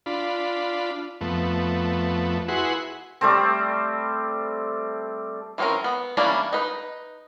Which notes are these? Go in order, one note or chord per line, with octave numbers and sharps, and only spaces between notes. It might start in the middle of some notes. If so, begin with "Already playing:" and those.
D4 F4 B5
F2 A3 B3
E4 F#4 G#4 B4 F#5 C6
G3 A3 C4
E3 A#3 C4 C#4 A#4
B3
E3 G3 A#3 C#4 D4
D#4 B4